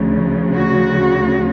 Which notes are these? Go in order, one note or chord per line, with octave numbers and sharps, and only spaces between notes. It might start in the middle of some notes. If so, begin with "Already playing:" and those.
Already playing: D2 C#3 F3
F#4